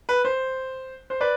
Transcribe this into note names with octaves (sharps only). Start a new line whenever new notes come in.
B4
C5
C5
B4 D5